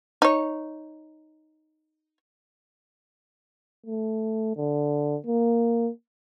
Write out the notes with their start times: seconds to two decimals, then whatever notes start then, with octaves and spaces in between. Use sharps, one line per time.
0.22 D#4 C#5
3.86 A3
4.57 D3
5.27 A#3